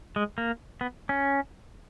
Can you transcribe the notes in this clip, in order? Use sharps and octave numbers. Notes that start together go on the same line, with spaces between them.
G#3
A#3
B3
C#4